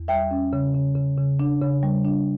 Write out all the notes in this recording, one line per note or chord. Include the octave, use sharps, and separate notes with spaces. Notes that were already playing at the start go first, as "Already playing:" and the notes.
Already playing: E2
G3 E5 G5
C#4
C#3
C#3
C#3
C#3
D4
C#3
G3
D4